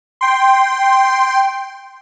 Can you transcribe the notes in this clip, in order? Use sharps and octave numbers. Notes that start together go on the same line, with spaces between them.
G5 C6